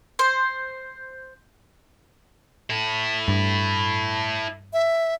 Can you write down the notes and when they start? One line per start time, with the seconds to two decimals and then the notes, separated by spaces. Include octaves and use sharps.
0.19 C5
2.70 E4 A4
3.28 G2
4.73 E5